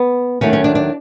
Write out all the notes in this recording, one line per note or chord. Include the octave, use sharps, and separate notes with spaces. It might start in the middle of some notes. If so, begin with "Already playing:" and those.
Already playing: B3
D#2 D#3 F#3 A3 C#4
C#4
D4
D4